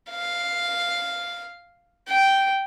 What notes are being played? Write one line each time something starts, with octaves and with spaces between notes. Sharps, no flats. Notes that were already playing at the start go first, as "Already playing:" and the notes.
F5
G5